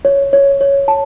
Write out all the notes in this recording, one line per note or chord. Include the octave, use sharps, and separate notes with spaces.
C#5
C#5
C#5
A5